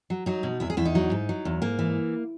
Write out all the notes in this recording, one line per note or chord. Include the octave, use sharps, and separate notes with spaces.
F#3
F#3 D#4
B2
E2 E4
G#4
E2 E4
D#4
F#3
G#2
F#3
E2
G#2 A#3
E3